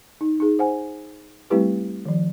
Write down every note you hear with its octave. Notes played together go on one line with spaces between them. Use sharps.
D#4
D#4 G#4
C5 F#5 G#5
G3 A3 C4 E4 G4 B4
D#3 F3